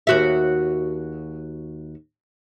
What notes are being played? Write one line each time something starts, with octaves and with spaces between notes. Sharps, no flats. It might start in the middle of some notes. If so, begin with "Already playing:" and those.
D#2 F#4 E5